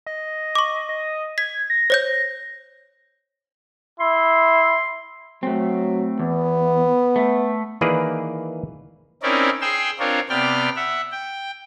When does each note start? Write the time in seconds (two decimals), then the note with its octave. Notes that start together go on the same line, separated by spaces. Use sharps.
0.06 D#5
0.55 C#6 D6
0.89 D#5
1.38 G#6 B6
1.70 A#6
1.90 C5 C#5 G6
4.00 E4 C6
5.43 F#3 A3 C4
6.19 E2 B3
7.16 A3
7.81 D#3 E3 A#3 G#4 B4 D5
9.23 C4 C#4 D#4 E4 A#4 D5
9.61 G#4 G5 C6 E6
9.99 C4 D4 F4 A#4 C#5
10.29 C3 B3 D5 G5 F6
10.76 E5 F#5
11.12 G5